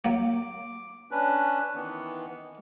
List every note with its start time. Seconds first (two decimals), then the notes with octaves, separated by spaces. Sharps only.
0.05 F#3 A#3 D6
1.11 C#4 D4 B4
1.75 D#3 E3 B3